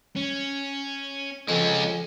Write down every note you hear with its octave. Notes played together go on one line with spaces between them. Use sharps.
C#4
F2 G#3 C#4